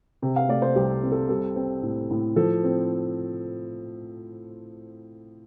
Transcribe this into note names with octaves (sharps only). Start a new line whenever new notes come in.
C3
F5
A3 D5
C5
C2 G4
C4
A4
G3 A4
C4
A2
A2
F3 A4
C4